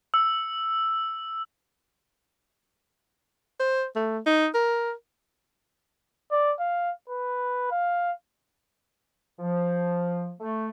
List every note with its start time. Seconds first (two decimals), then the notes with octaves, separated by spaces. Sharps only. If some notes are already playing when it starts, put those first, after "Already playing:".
0.14 E6
3.60 C5
3.96 A3
4.26 D#4
4.54 A#4
6.31 D5
6.60 F5
7.09 B4
7.71 F5
9.38 F3
10.39 A3